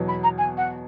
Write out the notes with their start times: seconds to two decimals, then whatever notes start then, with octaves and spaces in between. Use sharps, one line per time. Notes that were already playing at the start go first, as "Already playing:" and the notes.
Already playing: E2 B2 F#3 B3
0.08 B5
0.23 A#5
0.38 G#5
0.57 F#5